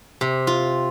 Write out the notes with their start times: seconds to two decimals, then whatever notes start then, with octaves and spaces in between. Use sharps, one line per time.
0.21 C3
0.47 F4